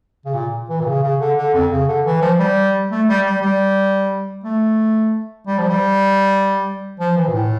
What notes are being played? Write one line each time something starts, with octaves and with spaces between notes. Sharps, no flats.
C#3
A#2
E3
A#2
C#3
C#3
D3
D3
F2
C#3
D3
E3
F3
G3
A3
G3
G3
G3
A3
G3
F3
G3
F3
E3
A#2
A2